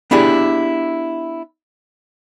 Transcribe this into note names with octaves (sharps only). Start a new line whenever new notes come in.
B3 D4 E4 G4 G#4